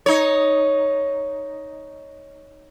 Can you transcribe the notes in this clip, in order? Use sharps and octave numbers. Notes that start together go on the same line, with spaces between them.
D#4 C#5